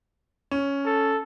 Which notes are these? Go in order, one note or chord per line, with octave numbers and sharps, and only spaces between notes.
C#4
A4